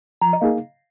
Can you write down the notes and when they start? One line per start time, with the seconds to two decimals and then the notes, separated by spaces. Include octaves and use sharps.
0.21 F3 A#5
0.33 D#5
0.41 A#3 D#4 G#4 F5